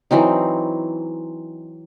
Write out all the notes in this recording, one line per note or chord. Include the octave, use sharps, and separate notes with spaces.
E3 F#3 C4 D#4